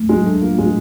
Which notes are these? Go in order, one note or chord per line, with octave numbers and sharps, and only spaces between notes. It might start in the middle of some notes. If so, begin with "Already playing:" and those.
Already playing: A3
F#3 G#3
A3 D4
A#3 F4
G#3 A3